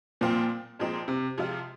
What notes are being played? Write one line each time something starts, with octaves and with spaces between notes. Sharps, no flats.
A#2 F3 C4 F4
A#2 F3 G#3 C4 D#4
C3
C3 F3 G#3 F4